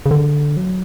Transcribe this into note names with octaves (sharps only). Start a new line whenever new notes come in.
C#3
D3
F#3